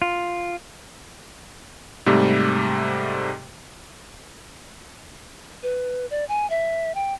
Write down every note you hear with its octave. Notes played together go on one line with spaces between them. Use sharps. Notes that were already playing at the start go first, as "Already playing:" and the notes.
F4
G#2 C3 G3 A3
B4
D5
G#5
E5
G5